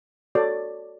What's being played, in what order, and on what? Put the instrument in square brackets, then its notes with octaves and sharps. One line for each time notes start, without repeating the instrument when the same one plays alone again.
[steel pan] F#4 A4 C#5 D5